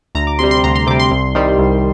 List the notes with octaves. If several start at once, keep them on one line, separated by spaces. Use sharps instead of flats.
D2 A#5
D6
C3 G3 C6
C6
D2 A#5
C6
C3 G3 D6
C6
C2
C3 D#3 G3
C2